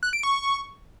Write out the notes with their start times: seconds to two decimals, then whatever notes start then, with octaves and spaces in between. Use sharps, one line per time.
0.03 F#6
0.13 D7
0.23 C#6